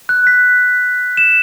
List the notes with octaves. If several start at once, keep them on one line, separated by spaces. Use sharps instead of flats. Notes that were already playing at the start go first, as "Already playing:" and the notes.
F#6
B6
E7